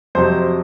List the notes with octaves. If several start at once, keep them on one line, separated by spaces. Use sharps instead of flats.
F2 C3 F#3 C5